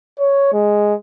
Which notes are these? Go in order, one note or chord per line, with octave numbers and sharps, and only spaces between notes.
C#5
G#3